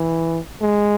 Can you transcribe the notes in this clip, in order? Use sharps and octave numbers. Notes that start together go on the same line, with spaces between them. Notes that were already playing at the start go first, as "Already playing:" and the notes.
Already playing: E3
G#3